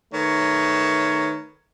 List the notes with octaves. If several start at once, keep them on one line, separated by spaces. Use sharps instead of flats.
D#3 A3 B4 C#5